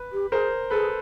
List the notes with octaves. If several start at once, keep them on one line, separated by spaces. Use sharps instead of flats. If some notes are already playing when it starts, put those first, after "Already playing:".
Already playing: B4
G4
G#4 A#4 C5
G#4 A4 B4